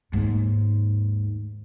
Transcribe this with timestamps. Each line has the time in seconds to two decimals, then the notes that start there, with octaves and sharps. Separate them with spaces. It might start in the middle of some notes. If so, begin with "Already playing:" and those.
0.12 D#2 G#2